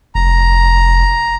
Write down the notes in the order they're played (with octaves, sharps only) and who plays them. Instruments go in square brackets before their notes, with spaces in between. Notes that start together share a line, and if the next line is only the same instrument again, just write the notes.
[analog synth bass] F1 [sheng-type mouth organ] A#5